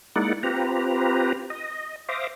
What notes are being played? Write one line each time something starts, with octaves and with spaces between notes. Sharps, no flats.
G#3 A#3 D#4 E4 D5 F#5
C4 F4 G4 B4 A#5
D#5
C5 E5 F5 D6 D#6 A#6